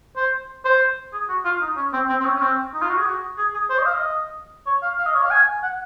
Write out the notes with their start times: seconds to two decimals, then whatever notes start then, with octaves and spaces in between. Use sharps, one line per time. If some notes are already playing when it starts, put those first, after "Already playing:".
0.16 C5
0.65 C5
1.13 G#4
1.29 F#4
1.45 F4
1.61 D#4
1.77 C#4
1.93 C4
2.09 C4
2.20 C4
2.25 C#4
2.36 C#4
2.41 C4
2.74 D#4
2.82 F4
2.89 F#4
2.97 G#4
3.06 F#4
3.38 G#4
3.54 G#4
3.70 C5
3.78 D#5
3.86 F5
3.94 D#5
4.66 C#5
4.82 F5
4.98 F5
5.06 D#5
5.14 C#5
5.22 F5
5.31 G#5
5.63 F#5